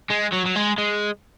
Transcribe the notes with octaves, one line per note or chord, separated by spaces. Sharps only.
G#3
F#3
F#3
G#3
G#3